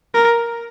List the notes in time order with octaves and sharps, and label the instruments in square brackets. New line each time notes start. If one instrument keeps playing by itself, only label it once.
[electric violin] A#4